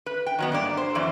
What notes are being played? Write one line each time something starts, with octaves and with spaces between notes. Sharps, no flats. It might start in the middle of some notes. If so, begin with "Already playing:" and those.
B4
G5
D#3 F#3 B3
G2 A#3 D5
C5
F#2 E3 C#4 D5